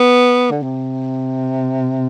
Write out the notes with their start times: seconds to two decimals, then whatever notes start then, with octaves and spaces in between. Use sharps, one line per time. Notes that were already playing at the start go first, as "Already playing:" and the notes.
Already playing: B3
0.51 D3
0.63 C3